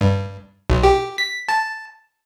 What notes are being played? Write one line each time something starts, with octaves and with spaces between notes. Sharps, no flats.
G2
B1
G4
B6
A5